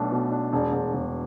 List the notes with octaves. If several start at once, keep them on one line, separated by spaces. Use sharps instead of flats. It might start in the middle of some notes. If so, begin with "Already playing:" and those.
Already playing: B1 B2 A3 D4
B2
D4
E1
E1
E1